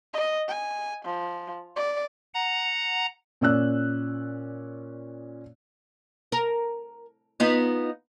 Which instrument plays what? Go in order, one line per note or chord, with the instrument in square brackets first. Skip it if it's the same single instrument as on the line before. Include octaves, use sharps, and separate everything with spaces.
[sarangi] D#5
G#5
F3
D5
[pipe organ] F#5 A#5
[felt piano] A#2 C#4 D5 E6 F#6
[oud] A#4
B3 D#4 F4